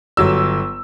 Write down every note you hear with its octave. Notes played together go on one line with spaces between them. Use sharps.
G1 F#3 E6